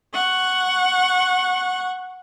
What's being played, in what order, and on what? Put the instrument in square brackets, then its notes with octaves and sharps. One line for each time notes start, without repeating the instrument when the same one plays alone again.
[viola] F#5 C#6